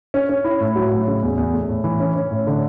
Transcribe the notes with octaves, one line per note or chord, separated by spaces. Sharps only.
C#4
C#4
E4
A2
F#3
A2
C#3
E2
E2
A3
A2
E3
C#4
C#4
A2
D3